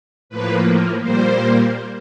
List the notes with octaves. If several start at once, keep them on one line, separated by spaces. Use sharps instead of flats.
A2 F3 A#3 B4
A#2 G3 A#3 C5